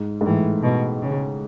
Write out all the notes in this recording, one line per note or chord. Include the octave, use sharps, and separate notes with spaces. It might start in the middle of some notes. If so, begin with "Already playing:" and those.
Already playing: G#2
G#2
A2 E3
B2
C#3